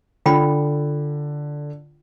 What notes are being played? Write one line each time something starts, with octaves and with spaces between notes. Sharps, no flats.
D3 F4 G5 B5